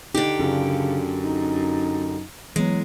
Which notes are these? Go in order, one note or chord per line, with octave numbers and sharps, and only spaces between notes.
D3 D4 D#4 G4
F#2 C#3 D4 F4 G#4
D#4
E3 F#3 G#3 B3